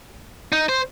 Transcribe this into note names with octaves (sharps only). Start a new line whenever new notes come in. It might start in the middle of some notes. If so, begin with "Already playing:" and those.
D#4
C5